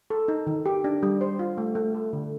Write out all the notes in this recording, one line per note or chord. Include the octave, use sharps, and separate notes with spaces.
A4
D#4
D#3
G4
D4
G3
C5
F4
A3
A3
A4
D3